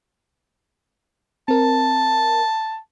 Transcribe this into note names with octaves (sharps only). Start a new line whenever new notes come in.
C4 A#4 A5